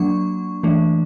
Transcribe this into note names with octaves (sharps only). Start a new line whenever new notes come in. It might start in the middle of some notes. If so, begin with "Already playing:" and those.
Already playing: F#3 A#3 D4 C#6
E3 A3 D4